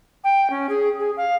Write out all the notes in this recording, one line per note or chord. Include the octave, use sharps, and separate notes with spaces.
G5
C#4
G#4
G#4
F5